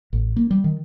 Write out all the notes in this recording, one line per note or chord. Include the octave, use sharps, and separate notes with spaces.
A1
A#3
G3
D#3